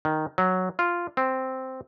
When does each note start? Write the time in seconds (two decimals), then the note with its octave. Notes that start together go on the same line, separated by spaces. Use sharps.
0.05 D#3
0.38 F#3
0.79 F4
1.17 C4